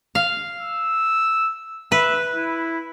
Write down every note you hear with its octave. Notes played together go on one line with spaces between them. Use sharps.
F5
E6
B4 E5
E4